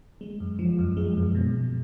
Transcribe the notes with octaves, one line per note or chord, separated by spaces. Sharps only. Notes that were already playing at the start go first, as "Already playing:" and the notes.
G#3
F#2
F3
F#2
G#3
F#2
B2
B2